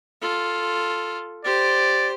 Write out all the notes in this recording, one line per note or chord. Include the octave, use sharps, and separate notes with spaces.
F4 A4
G4 C5 D5